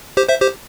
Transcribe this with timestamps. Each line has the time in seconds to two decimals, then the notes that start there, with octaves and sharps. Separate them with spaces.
0.17 G4 C5
0.29 C5 E5
0.41 G4 C5